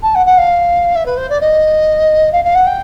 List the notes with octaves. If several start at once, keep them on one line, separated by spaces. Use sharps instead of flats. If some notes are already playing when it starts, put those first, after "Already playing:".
A5
F#5
F#5
F5
E5
B4
C5
D5
D#5
F5
F5
F#5
G5